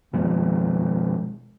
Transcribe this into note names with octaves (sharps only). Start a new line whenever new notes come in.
B2 F3 G#3